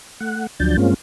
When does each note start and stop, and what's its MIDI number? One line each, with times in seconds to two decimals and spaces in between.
0.20 0.47 57
0.20 0.47 78
0.59 0.77 38
0.59 0.77 53
0.59 0.77 54
0.59 0.77 62
0.59 0.77 91
0.59 0.77 93
0.77 0.94 43
0.77 0.94 56
0.77 0.94 58
0.77 0.94 60
0.77 0.94 61
0.77 0.94 65